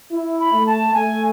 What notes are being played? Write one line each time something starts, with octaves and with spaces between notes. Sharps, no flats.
E4
B5
A3
A5
A3 G#5